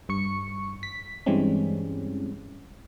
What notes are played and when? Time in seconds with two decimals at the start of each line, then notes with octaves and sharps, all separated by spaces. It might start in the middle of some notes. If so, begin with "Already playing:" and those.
0.09 G2 C#6 C#7
0.83 B6
1.26 G2 E3 G3 G#3 C4 C#4